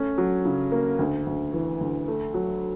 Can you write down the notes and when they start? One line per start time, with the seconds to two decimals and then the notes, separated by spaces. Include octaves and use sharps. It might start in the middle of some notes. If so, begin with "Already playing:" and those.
Already playing: A3 C#4
0.18 F#3
0.45 C#3
0.72 A#3
0.99 D2
1.26 D2
1.53 E3
1.80 D2
2.08 A3
2.34 F#3